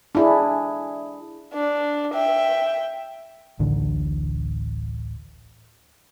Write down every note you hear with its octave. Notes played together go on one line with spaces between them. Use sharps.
D4 E4 G#4
D4
E5 G5
D1 A1 D3 D4